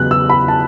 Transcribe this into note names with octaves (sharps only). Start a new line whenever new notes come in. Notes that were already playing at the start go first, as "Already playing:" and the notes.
Already playing: E2 C#3 F#3 B3 F#6
E6
B5
A5